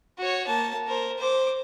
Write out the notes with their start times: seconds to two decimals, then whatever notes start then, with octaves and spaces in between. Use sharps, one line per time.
0.18 F#4 C#5
0.47 A#3 A5
0.87 A#4 C5
1.18 C5 D6